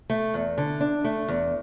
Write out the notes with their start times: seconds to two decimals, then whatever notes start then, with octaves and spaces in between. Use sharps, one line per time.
0.10 A3
0.34 E2
0.58 D3
0.80 D4
1.04 A3
1.28 E2